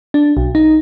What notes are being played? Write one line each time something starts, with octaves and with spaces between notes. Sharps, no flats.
D4
B1
D#4